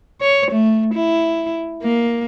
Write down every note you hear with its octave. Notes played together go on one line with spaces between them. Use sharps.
C#5
A3
E4
A#3